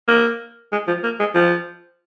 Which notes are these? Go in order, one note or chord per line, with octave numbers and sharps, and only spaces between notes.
A#3
G#3
F3
A#3
G#3
F3